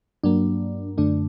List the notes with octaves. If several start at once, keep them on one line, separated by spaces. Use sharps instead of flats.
G2 F#3 A#3 D4
F#2 D3 A3 D4